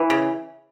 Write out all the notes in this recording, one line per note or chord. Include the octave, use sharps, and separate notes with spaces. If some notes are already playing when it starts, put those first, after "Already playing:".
Already playing: E3
C#3